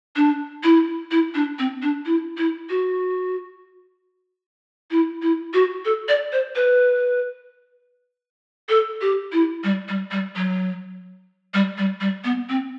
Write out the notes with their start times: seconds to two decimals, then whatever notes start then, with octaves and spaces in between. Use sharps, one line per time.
0.16 D4
0.63 E4
1.11 E4
1.34 D4
1.59 C4
1.82 D4
2.06 E4
2.37 E4
2.70 F#4
4.91 E4
5.22 E4
5.54 F#4
5.85 A4
6.08 D5
6.32 C5
6.56 B4
8.69 A4
9.01 G4
9.32 E4
9.64 G3
9.89 G3
10.11 G3
10.36 F#3
11.54 G3
11.78 G3
12.01 G3
12.24 B3
12.49 C4